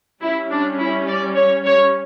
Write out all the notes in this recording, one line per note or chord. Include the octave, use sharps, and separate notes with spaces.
G3 C#4 E4
D4
E4
D5
C#5
C#5